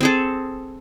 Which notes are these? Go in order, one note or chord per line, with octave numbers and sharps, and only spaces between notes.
C4 G#4 A4